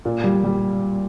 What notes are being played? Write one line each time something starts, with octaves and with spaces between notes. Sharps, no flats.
A#2
G3
G3